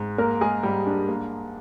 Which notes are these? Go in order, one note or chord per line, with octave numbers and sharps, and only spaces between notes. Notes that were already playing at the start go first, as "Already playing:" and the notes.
Already playing: G#2
A#3 A#4
G#3 G#4
G#2 G3 G4
D4
A#3